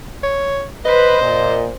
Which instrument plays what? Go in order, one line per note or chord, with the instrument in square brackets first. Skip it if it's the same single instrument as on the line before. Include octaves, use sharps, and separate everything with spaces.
[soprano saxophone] C#5
[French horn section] B4 [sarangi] C5 [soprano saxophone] D#5
[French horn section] A#2